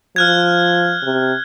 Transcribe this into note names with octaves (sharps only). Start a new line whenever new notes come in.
F3 F6 F#6 G#6
C3